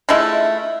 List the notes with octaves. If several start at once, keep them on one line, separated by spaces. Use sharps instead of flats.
G#3 A3 E4 F4